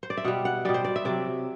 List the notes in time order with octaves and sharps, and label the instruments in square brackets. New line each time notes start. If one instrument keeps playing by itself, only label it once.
[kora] C5
D5
E5
B2 G3 F#5
F#5
B2 G3 D5
C5
D5
E5
C3 F#3 D5